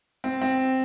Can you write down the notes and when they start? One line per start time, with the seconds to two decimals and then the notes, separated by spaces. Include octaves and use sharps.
0.24 C4
0.42 C4